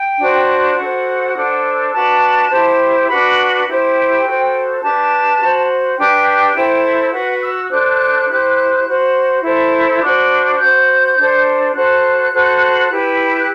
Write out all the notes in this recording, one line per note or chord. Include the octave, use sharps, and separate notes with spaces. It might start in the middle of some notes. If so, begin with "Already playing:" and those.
Already playing: G5
D4 F#4 C5
F#4 A4 C5 F#5
D4 A4 C5
D4 F#4 B4 A5
E4 G4 C5
D4 F#4 B4 B5
E4 G4 C5
G5
F#4 A4 C5
D4 G4 B4 A5
F#4 C5
D4 G4 B4 G5
E4 A4 C5
F#4 B4 F#5
E6
D4 A4 C5 F#6
E4 G4 C5
F#4 C5
E4 A4 C5
D4 F#4 C5
F#4 C5 G6
D4 A4 C5
F#4 A4 C5 F#6
F#4 A4 C5
E4 G4 B4
F#6